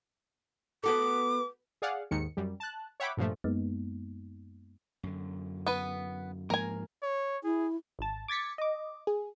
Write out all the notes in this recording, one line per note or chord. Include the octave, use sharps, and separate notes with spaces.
B3 F#4 A4 D6
G#4 D5 F5 F#5
D#2 G#2 D#3 C#7
F#2 G3
A5 F#6
C#5 E5 F#5 G5 B5 D6
G2 A#2 F3 A3
F#2 G#3 A#3 B3 D#4
F#2 D3
B3 B4
G#2 F3 A#3 A#4 G#5
C#5
E4 G#4
G#1 A5
D6 G#6 A6 B6 C#7
D#5 D6
G#4